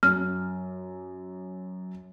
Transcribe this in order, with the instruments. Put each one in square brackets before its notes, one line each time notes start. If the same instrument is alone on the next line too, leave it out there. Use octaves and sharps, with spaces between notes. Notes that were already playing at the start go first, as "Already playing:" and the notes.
[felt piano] F#2 [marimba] F6